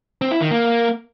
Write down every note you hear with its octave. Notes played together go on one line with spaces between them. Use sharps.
C4
E4
D#3
A#3